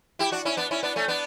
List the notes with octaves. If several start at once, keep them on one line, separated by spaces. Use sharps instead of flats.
E4 G4
D4 F#4
C#4 E4
B3 D4
C#4 E4
B3 D4
A3 C#4
B3 D4